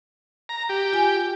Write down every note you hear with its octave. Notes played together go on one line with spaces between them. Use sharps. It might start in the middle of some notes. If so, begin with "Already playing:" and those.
A#5
G4
F4 G#5